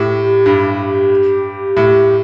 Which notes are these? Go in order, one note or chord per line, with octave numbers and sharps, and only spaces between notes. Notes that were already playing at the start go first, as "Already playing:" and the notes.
Already playing: A2 G4
G2
A2